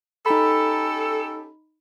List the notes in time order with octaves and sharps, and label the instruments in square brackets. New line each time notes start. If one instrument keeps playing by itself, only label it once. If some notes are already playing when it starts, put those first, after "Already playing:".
[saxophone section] C#4 G4 A4 [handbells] D#4 B5